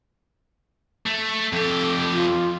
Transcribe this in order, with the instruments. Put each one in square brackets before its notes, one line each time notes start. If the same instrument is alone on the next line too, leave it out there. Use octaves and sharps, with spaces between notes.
[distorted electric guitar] A3
[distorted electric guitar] F2 G4 [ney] A4
[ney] F4